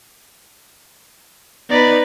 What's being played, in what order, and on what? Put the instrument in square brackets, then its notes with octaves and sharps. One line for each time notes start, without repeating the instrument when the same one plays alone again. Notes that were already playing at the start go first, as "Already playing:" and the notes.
[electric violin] B3 D5 [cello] D#4 B4